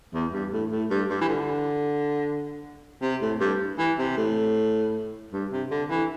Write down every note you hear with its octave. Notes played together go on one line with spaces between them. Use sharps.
E2
G2
A2
A2
G2
G2
E3
D3
C3
A2
G2
E3
C3
A2
G2
C3
D3
E3